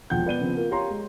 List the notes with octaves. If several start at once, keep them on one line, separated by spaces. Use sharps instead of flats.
E1 F3 F#5 G5 G6
B3 D5 D#7 G7
C#3 F3 B3 C4
A#3 F4
G4 C#5 F5 A#5 C6
G#3